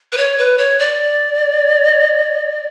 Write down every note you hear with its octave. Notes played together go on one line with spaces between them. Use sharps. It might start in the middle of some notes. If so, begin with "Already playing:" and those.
B4
C#5
B4
C#5
D5